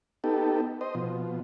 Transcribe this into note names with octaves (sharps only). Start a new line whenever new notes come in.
B3 D#4 G4 A4
C5 D#5
B2 F3